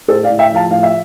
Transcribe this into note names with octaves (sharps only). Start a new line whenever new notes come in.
A2 A4 C5
D5 F5
A2
E5 G5
F3
F5 A5
A2 F5
E5